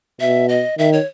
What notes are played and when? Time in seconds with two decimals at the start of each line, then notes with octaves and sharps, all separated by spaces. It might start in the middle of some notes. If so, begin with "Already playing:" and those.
0.20 B2 E5
0.49 D#5
0.78 D#3 E5
0.93 C#5